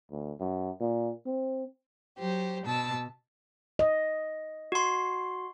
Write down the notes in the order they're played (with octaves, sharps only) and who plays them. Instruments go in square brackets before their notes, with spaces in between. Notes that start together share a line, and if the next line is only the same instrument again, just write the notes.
[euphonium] D2
F#2
A#2
C4
[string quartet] F#3 G4 C5
B2 A5 E6
[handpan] D#5
[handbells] F#4 C6